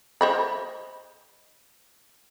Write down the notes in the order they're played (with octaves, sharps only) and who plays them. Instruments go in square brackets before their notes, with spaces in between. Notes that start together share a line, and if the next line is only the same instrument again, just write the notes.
[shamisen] C5 D#5 B5